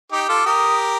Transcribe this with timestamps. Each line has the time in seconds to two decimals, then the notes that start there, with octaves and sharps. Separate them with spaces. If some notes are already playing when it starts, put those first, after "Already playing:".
0.12 D#4 G4 D6
0.29 F4 A4
0.46 G4 A#4 D#6